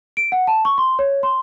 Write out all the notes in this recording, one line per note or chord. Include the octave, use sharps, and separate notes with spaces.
D7
F#5
A5
C#6
C6
C#5
C6